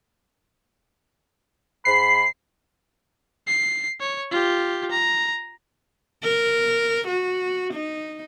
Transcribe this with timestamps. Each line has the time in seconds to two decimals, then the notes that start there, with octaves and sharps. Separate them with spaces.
1.85 G#2 B5 C7
3.47 C7
4.00 C#5
4.31 F4 G4
4.91 A#5
6.24 A#4
7.08 F#4
7.74 D#4